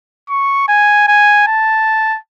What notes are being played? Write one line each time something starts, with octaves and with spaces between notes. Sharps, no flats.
C#6
G#5
G#5
A5